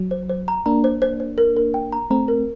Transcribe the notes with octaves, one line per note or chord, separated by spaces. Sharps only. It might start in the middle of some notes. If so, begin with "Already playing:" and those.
Already playing: F#3
C5
C5
A#5
A#3 D4 A#5
C5
C5
C5
A#4
A#4
G5
A#5
A3 C4 A#5
A#4